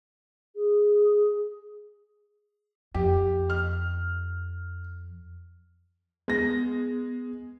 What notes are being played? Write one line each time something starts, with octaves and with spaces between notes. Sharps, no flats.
G#4
F2 G4
F6
G#3 B3 A#6